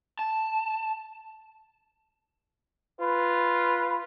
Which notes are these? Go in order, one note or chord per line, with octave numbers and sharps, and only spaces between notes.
A5
F4 B4